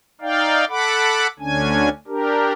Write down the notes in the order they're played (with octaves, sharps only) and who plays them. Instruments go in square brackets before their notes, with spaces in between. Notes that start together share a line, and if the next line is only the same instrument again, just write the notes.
[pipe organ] D#4 D5 F5 G5
A4 F#5 B5 D6
D2 D3 C#4 D4 G#5
D4 G4 A#4